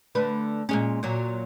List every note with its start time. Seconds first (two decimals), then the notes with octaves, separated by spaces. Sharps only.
0.15 D3 A3 B4
0.69 A#2 G#3 C#4
1.03 A#2 F#3